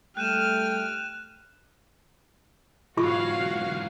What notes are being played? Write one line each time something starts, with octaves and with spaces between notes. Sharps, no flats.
G3 A3 G5 F6 F#6 D#7 E7
B1 G#2 F4 F#4 C#5 F5 C#6